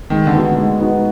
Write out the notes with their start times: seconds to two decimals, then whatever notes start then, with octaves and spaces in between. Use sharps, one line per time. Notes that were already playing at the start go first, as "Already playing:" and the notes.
0.10 D#3 G#3
0.27 D3
0.33 B3 D#4 F#4
0.57 G#3
0.80 B3 D#4 F#4